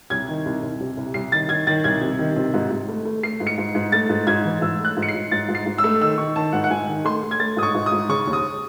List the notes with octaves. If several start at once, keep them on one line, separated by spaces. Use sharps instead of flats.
C2 G#6
D#3
C2
C2
C3
C2
C2 C7
D#3 A6
D#3 G#6
D#3 A6
C2 G#6
C3
D#3
C3
G#2
G#2
A3
A3
A3 C7
G#2
C#7
G#2
G#2
A3 A6
G#2
G#2 G#6
E3
G#2 E6
A3 F#6
G#2
C#7
C7
G#2
G#2 A6
G#2
C7
G#2
E6
A3
D#3 E6
D#3 C#6
D#3 A5
G#2 F#5
F#5
G#2 G#5
D#3
A3 C6
A3
G#6
A3 A6
G#2 D#6
C#6
G#2
D#6
G#2
C#3 C#6
D#2
D#6